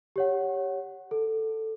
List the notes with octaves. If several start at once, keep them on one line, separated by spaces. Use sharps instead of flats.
G4 C#5 F#5
A4